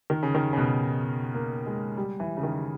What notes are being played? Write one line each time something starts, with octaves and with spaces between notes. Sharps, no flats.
D#3
C#3
D#3
C#3
B2
A#3
G#3
G3
E3
C#3
D#3